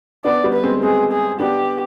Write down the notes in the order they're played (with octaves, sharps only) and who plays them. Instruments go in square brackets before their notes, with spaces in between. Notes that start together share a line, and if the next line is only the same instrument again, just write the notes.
[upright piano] B3 D4 [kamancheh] D5
[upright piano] G3 B3
[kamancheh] B4
[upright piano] G#3 C4
[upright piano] G#3 C4 [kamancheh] G#4
[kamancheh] G#4
[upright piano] B3 D4 [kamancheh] G4